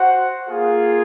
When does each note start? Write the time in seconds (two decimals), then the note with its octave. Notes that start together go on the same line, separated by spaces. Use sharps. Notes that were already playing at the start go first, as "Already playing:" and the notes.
Already playing: F#4 C5 F#5
0.49 A#3 F4 G#4